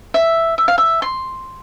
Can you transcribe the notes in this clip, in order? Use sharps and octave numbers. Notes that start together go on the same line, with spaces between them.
E5
E5
F5
E5
C6